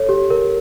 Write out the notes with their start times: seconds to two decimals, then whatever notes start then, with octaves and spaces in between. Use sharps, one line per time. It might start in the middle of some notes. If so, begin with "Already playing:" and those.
Already playing: A4 C#5
0.09 G4
0.30 A#4